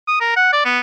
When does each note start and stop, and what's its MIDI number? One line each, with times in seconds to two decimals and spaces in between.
0.08 0.19 87
0.21 0.34 70
0.36 0.49 78
0.53 0.65 74
0.65 0.80 59